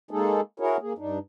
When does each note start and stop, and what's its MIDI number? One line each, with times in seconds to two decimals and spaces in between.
0.11 0.41 56
0.11 0.41 58
0.11 0.41 63
0.11 0.41 68
0.11 0.41 69
0.60 0.77 64
0.60 0.77 66
0.60 0.77 68
0.60 0.77 70
0.60 0.77 73
0.81 0.93 58
0.81 0.93 68
0.98 1.19 43
0.98 1.19 62
0.98 1.19 63